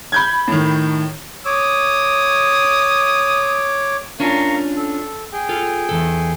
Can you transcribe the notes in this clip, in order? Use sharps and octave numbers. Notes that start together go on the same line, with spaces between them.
B5 G6 G#6
A2 D#3
C#5 D6 D#6
C#4 D4 F4 A#4 F5 C#6
A4
G#4 G5
F4 A4
E2 C3 A4